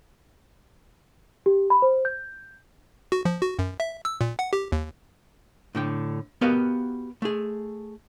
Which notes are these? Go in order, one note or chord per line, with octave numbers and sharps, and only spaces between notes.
G4
B5
C5
G6
F#4
F3
F#4
F#2
E5
E6
A#2
F#5
G4
D#2
A2 D3 G5
B3 F#4 G4 A#4 D#5 F5
A3 G#4